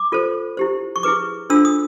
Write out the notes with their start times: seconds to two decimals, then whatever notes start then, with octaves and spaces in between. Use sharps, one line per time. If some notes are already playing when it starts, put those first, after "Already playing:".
Already playing: D6
0.12 F4 A4 C5
0.57 E4 G4 C5
0.96 C#6
1.03 E4 G#4 B4 D6
1.50 D4 F4 A4 C5 E6
1.65 D#6